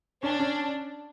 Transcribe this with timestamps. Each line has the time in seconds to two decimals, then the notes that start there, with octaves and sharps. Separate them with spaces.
0.22 C#4 D4
0.40 C#4